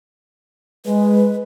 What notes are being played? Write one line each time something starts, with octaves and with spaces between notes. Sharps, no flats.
G#3 B4